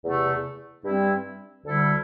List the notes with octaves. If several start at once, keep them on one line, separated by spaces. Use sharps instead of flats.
E2 C3 A3
G2 G3 C4 E4
D2 D3 G3 E4 A4